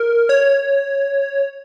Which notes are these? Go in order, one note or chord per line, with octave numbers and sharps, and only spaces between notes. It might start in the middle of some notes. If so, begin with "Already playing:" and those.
Already playing: A#4
C#5